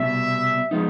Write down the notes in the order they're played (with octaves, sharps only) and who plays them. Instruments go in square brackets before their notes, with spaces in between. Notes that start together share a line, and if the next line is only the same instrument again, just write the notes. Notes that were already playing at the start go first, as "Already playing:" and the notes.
Already playing: [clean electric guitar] C2 B2 G3 [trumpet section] E5
[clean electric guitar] F3 G#3 B3 D#4